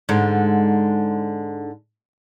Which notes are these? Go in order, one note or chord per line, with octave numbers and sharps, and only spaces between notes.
G#2 D3